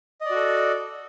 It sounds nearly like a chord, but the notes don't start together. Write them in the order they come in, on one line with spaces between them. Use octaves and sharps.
D#5 D5 F#4 A4